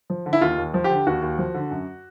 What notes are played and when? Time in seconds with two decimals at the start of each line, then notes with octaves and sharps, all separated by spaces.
0.10 F3
0.26 D3
0.33 E4
0.41 D#2 F4
0.58 D#2
0.74 F3
0.84 G4
0.90 D3
1.07 D#2 F#4
1.22 D#2
1.38 F3
1.54 D3
1.70 F#2